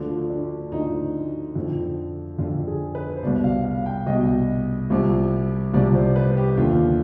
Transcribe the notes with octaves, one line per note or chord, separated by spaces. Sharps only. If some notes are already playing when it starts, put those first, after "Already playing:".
Already playing: D2 D3 F3
F4
D4
D2 D3 F3 D#4
F2 D3 F3
F2 D3 F3 F4
G#4
B4
C5
C2 B2 D5
F5
F5
G5
C2 B2 D#5
C2 C3 F3
C2 C3 F3 D5
C5
B4
G4
D#2 D3 F3 F4